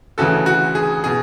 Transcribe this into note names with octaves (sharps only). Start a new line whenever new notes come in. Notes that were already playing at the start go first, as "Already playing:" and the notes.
D2 C#3 E3 F#4 A4
F#4
G#4
B2 G#4